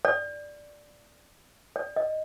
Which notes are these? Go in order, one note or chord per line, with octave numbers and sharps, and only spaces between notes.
D5
D5
D#5